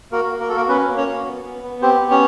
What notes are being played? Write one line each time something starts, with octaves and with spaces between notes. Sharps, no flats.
A#3 F#4 A#4
A#3
A#4
F#4 A4
A#3 A#4
B3 C#4 B4
A#3
C#4 C#5
F#4
B3
B3
B3
C4 G4 C5
B3
C#4 C#5